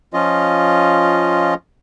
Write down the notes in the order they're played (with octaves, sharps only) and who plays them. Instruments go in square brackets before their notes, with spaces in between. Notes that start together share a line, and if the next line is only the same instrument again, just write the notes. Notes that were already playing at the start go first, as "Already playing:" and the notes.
[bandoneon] F3 C#4 F4 D#5